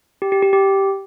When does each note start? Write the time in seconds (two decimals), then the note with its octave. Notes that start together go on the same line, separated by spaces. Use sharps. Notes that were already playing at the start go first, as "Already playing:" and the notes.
0.22 G4
0.32 G4
0.42 G4
0.53 G4